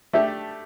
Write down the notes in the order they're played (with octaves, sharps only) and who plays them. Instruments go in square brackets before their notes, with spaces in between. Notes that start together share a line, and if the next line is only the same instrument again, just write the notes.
[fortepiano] A3 D4 G4 [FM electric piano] E5